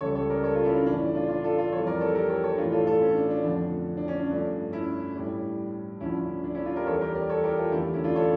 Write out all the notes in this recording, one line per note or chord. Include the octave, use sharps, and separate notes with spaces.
C#2 C#3 G3 A4 C#5
A4 C#5
A#4 D5
A4 C#5
F4 A4
C#4 E4
D4
A2 E3 A3 D4
D4
D4 F4
D4 F4
F4 A4
F4 A4
F2 E3 G3 A4 C#5
A#4 D5
A4 C#5
G4 A#4
A4 C#5
A4 C#5
A2 E3 A3 D4 F4
F4 A4
F4 A4
C#4
D4
D4
F2 D3 F3 A3
D4
C#4
D4
G2 F3 A3
C#4 E4
A2 G3
D2 D3 F3 C#4 E4
D4
C#4 E4
D4 F4
G4 A#4
E2 E3 G3 A4 C#5
G4 A#4
A#4 D5
A4 C#5
G4 A#4
F4 A4
E2 D3 A3 E4 G4
C#4 E4
D4 F4
A4 C#5